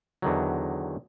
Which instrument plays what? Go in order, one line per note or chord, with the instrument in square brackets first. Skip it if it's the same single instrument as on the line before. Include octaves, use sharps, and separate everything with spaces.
[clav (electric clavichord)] E2 D3 D#3 F#3